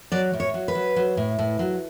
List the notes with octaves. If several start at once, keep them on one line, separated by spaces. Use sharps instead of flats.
F#3 D5
A2
C#5
F#3
B4
F#3
F#3
A2
A2
F#3